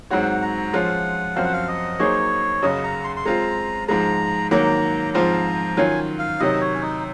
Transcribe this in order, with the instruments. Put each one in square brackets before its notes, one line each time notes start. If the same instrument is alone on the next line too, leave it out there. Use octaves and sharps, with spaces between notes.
[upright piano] G#2 F#3 C4 F#4 C#5 [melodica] F#5
[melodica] A#5
[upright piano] F3 G#3 C#4 F4 [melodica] F#5
[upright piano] F#2 F3 C4 F#4 C5 [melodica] F5
[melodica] F#5
F5
D#5
[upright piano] F#3 A#3 D#4 G#4 C5 [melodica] C#5
[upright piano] F#2 C#3 F#3 C#4 [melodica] D#5
[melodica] A#5
C6
C6
[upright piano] G#3 C4 F4 [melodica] A#5
[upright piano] G#2 F3 G#3 [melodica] A#5
[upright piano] G#2 D#3 F#3 A#3 [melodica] A#5
[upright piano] G#2 F3 C4 F4 C5 [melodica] A#5
[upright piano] D#3 F#3 C#4 F4 [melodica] G#5
[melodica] F5
[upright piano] C3 D#3 F#3 [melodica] D#5
[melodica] C#5
C#4
D#4